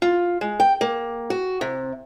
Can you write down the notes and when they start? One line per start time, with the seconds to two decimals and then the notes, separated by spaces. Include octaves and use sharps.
0.02 F4
0.41 G#3
0.60 G5
0.81 A#3
1.30 F#4
1.61 C3